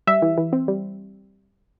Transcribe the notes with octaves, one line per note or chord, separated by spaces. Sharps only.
G3 E5
E3
E3
C4
G3